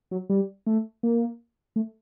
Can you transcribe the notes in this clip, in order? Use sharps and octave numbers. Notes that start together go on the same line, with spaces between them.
F#3
G3
A3
A#3
A3